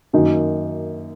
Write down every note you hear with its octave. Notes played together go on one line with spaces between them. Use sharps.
F#2 D#3 F#3 A#3 D#4